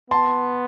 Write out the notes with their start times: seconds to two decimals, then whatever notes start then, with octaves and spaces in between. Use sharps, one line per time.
0.10 B3 A5 C6